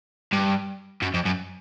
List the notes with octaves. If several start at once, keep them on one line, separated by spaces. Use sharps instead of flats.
G2
F#2
F2
F#2